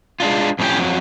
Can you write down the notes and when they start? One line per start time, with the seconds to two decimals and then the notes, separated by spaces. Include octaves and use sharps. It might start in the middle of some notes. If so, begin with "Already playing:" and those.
0.20 G#3 D4 F4
0.59 F2 A2 C#4 D4 G4
0.79 F2 F#3